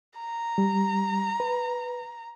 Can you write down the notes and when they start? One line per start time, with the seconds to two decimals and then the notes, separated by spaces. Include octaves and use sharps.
0.20 A#5
0.58 G3
1.40 B4